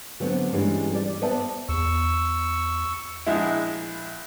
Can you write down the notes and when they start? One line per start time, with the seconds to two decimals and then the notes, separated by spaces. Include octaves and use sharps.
0.20 D3 F#3 A3 B3 C4
0.52 G2 E3 G3 G#3 C#4 D4
0.91 G3 D5
1.22 B3 B4 C5 D5 E5 A5
1.69 E2 C#6 E6
3.26 A#1 G#3 E4